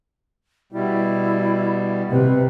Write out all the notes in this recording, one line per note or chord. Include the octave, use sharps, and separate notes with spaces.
B2 G3 E4
C3 B4